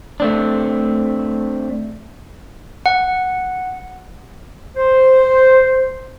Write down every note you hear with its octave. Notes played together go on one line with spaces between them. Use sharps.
A3 C4 D4
F#5
C5